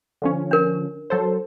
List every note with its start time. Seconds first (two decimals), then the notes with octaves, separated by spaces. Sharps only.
0.22 D3 F3 C#4
0.51 D4 A#4
1.10 F#3 A4 C5